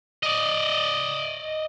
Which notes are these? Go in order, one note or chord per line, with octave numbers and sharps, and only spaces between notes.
D5 D#5